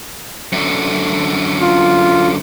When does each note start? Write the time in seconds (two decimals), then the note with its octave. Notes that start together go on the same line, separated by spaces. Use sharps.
0.52 F#2 D3
1.62 F4